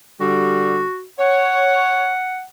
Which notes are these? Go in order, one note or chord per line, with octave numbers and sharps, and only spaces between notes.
D3 G3 F#4
C#5 F#5